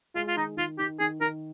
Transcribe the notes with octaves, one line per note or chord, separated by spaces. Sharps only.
G#3 F4
F4
D#3 D#4
D#3 F4
D#3 G4
D#3 G#4
D#3 A#4